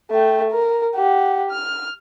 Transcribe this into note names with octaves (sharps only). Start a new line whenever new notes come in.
A3 G5
A#4
G4 F#5
F6